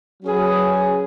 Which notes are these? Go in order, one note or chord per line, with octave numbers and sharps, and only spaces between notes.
F#3 C#4 G#4 B4